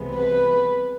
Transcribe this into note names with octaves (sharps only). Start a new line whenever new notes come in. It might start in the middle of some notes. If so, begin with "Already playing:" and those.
Already playing: C2 C3 E3 G#3 B3
B4